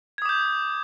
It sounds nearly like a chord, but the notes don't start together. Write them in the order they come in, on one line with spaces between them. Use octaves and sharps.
G#6 D#6 D6 G6